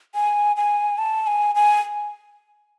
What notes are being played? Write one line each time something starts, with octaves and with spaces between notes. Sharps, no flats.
G#5
G#5
A5
G#5
G#5